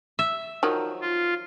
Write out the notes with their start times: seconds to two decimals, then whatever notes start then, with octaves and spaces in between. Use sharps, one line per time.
0.19 E5
0.63 D#3 F3 F#3
1.01 F4